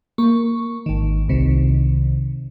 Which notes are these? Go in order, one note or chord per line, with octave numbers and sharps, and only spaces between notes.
A#3 C#6
G#1 D#3
C2 C3 D#3